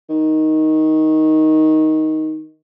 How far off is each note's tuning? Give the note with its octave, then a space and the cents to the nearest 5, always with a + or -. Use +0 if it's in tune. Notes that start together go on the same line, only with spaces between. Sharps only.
D#3 +10